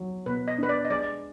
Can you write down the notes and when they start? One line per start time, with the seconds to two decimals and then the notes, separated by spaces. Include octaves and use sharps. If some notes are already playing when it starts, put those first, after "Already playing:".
Already playing: F#3
0.26 B2 B4
0.48 D#5
0.58 D4 B4
0.69 D5
0.85 D#5
0.90 G#3 D5